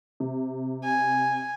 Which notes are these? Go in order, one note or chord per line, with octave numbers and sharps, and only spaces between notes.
C3
G#5